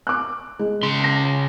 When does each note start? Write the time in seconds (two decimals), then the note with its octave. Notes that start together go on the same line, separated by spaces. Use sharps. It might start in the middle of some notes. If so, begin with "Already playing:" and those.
0.07 D6 F#6
0.59 G#3
0.83 C#3 C6
1.00 A5 A#6